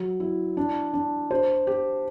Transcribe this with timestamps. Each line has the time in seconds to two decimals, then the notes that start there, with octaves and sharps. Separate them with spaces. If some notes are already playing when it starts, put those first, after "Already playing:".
Already playing: F#3
0.20 E4
0.57 D4
0.94 D4
1.31 C5
1.67 G4